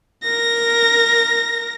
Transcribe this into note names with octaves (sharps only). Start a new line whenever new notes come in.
A#4 A#6